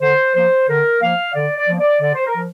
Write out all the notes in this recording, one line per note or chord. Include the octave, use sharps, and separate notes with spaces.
D3 C5
F3 A#3 C5
D3 A#4
F3 A#3 F5
D3 D5
D5
F3 A#3
D5
D3 D5
C5
A#4
F3